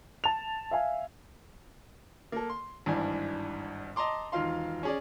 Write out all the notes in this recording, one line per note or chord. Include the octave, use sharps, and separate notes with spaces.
A5 F7
E5 F5 G#5
A#3 A4
C6
G#1 G2 E3 D4 G#5
D#5 A5 A#5 C6 D6
E1 D#3 F4 F5 C6
C#4 G#4 D5